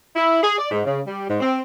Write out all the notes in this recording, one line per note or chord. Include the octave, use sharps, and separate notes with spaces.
E4
G#4
D5
G#2
C#3
G3
G#2
C4